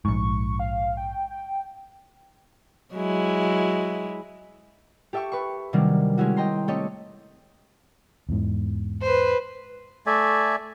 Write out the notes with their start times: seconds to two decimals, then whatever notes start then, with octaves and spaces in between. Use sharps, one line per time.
0.05 A#1 G#2 C#6
0.59 F5
0.97 G5
1.30 G5
2.94 F#3 G#3 E4
5.13 G4 A4 E5 G5 C#6 E6
5.32 B4 B5 C#6
5.73 C3 D#3 F#3 G3 A#3 D4
6.18 G#3 C#4 E4 F#4
6.37 D#5 G5 A#5 C6
6.68 A3 C4 G4 A4 C#5 D#5
8.29 E2 G#2
9.02 B4 C5
10.07 A3 D5 E5 G#5